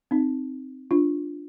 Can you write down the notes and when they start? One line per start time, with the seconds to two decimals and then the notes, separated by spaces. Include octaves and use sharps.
0.11 C4 D#4
0.91 D4 F4